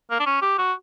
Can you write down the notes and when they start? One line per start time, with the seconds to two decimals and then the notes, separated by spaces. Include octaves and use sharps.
0.11 A#3
0.19 D4
0.26 C#4
0.42 G4
0.58 F#4